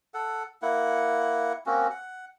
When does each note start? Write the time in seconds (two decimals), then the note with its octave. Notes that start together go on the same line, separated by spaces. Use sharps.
0.14 A4 F#5
0.62 A#3 E4 F#5
1.66 A#3 C4 C#4 F#4
1.90 F#5